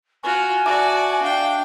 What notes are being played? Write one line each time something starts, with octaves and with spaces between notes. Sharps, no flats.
F4 F#4 G#5 C#6
F#4 D5 E5 A5 D6
D4 F5 G5